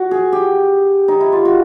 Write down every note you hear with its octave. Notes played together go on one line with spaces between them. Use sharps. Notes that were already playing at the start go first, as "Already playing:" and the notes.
Already playing: F#4
G#4
G4
D#4
E4
F4
F#4